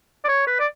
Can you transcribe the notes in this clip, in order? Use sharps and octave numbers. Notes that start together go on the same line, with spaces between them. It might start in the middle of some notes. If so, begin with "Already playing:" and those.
D5
C#5
B4
D5